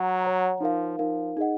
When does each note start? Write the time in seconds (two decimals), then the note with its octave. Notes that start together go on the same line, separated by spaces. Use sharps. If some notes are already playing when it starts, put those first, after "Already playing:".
Already playing: F#3 C#5 F#5 A#5
0.22 C#5 F#5 A#5
0.61 F3 D#4 A#4 F5
0.99 F3 D#4 A#4 F5
1.37 D#4 G#4 D#5 F#5